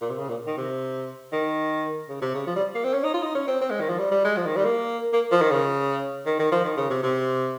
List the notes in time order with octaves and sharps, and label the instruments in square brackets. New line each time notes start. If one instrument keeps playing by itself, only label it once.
[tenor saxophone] A#2
C3
C#3
A#2
D#3
C3
D#3
C#3
C3
C#3
F3
G3
A#3
C4
C#4
D#4
F4
D#4
C#4
C4
C4
G#3
D#3
F3
G3
G3
G#3
F3
D#3
G3
A#3
A#3
F3
D#3
C#3
D#3
D#3
F3
D#3
C#3
C3
C3